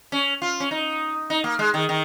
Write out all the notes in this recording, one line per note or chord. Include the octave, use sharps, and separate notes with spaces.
C#4
F4
C#4
D#4
D#4
A#3
G#3
D#3
D#3